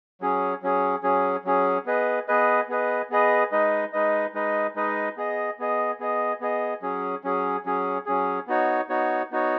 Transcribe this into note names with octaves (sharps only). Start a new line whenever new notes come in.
F#3 C#4 G#4
F#3 C#4 G#4
F#3 C#4 G#4
F#3 C#4 G#4
B3 G#4 B4 D#5
B3 G#4 B4 D#5
B3 G#4 B4 D#5
B3 G#4 B4 D#5
G#3 D#4 B4 D#5
G#3 D#4 B4 D#5
G#3 D#4 B4 D#5
G#3 D#4 B4 D#5
B3 G#4 D#5
B3 G#4 D#5
B3 G#4 D#5
B3 G#4 D#5
F#3 C#4 G#4
F#3 C#4 G#4
F#3 C#4 G#4
F#3 C#4 G#4
B3 D#4 F#4 C#5
B3 D#4 F#4 C#5
B3 D#4 F#4 C#5